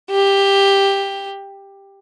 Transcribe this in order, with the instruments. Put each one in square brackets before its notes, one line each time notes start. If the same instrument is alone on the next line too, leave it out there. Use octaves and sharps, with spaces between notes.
[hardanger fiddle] G4